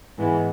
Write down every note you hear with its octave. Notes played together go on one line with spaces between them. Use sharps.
G#2 E3 G#3 B3